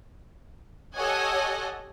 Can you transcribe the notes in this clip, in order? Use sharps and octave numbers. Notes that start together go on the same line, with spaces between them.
G4 A4 C#5 D#5 F#5 G#5